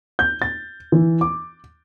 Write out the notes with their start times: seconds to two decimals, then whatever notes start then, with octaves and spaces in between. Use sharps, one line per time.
0.19 G6
0.42 A6
0.92 E3
1.21 D6